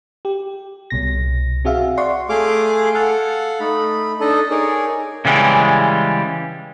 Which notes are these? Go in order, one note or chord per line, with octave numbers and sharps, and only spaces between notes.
G4
C2 B2 A#6
C4 F#4 G#4 E5 F5
D5 F#5 C6 C#6
A3 G#4 F5 C6 D6
A4 F5 F#5
A3 D#4 B5
D4 D#4 A4 D#5
D#4 G#4 A#4 C#5 D5
C#3 E3 G3 G#3